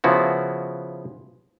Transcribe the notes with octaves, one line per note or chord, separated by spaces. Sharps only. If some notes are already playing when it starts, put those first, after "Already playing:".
C#3 F3 B3 E4 F#4